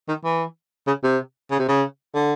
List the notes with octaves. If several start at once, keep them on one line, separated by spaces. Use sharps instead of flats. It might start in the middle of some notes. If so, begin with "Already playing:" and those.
D#3
E3
C#3
C3
C#3
C3
C#3
D3